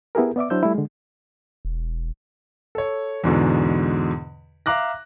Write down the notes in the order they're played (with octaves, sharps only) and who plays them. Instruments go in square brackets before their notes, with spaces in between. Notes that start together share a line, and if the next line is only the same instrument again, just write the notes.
[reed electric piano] B3 E4 G4 G#4 A#4
B3 D5 E5 D6
F#3 D4 E4 C5 E6 G6
G3 A3 E4
D3 G#3
[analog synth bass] E1
[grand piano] A4 C#5
E2 G#2 B2 D3
E5 F5 A#5 D6 F#6 A#6